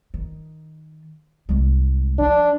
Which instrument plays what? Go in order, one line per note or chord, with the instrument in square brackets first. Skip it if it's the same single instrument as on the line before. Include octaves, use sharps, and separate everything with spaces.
[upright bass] D#3
C2 G#3
[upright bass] F3 [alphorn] D4